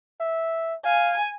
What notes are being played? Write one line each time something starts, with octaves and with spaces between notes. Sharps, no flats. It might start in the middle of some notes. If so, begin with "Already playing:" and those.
E5
F5 G#5